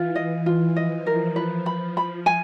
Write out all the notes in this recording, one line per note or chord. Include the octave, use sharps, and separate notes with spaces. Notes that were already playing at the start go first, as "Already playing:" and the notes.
Already playing: E3 F4
D#5
F4
F3 D#5
A#4
F3 B4
B5
B5
G#5